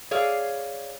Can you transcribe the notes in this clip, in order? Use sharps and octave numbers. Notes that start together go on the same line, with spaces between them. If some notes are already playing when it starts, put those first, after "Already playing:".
G#4 C#5 D5 F5